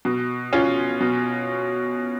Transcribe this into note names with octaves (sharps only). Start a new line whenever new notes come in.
B2
C#4 F4
B2